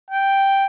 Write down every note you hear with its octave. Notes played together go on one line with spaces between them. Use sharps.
G5